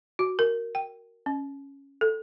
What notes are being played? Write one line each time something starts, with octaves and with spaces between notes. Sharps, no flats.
F#4
A#4
G5
C#4
A4